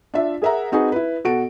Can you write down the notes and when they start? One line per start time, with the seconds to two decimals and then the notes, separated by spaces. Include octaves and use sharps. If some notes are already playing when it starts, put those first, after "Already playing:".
0.14 D4 F4 E5
0.42 G#4 A#4 E5 F#5 A#5
0.72 C4 D#4 F#4 G#4 B4
0.92 E4 B4
1.24 B2 F#4 A4 D7